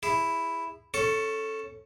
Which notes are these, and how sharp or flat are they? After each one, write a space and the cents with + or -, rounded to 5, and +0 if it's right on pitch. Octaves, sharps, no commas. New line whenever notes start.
E4 +0 G#4 -25
C#4 -15 A4 +0 C#6 +15